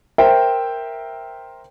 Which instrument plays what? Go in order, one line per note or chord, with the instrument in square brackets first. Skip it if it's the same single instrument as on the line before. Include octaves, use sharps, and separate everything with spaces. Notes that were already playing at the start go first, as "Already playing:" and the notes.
[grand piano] A#4 C5 E5 G5